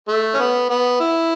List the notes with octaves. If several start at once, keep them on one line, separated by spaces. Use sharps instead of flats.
A3
C#4
B3
B3
E4